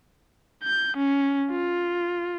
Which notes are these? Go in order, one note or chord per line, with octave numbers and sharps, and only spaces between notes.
G6
C#4
F4